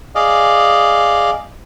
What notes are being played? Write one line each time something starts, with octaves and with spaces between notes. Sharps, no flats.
G#4 D5 D#5 F5